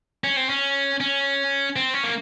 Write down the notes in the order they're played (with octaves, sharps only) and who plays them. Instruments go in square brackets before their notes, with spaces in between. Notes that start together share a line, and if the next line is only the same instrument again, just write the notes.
[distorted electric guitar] C#4
C4
C#4
C#4
C4
C#4
A#3